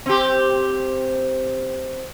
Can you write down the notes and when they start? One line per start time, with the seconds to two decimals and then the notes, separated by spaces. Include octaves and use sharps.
0.06 C4 G4